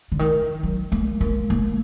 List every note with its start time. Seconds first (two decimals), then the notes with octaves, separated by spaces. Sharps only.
0.12 D3
0.19 D#3
0.63 F#3
0.92 A#3
1.21 A#3
1.50 A#3